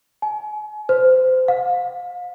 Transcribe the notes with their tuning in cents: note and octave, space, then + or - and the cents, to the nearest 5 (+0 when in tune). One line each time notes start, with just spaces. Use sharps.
G#5 +35
C5 -25
F5 +35